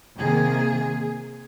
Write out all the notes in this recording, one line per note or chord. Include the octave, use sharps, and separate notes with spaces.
C3 D#3 A#3 G#4